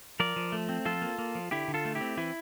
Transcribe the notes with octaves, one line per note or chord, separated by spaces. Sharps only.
F3 A#4 D5
F3
A3
C4
F3 F4 A4
A#3
A#3
F3
D3 E4 G4
D3
F4 A4
A3
E4 G4
C4
E3 E4